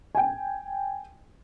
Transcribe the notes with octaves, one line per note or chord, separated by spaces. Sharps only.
G5 G#5